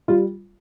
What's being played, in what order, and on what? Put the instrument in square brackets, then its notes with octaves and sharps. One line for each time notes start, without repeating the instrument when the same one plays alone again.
[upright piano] G3 F4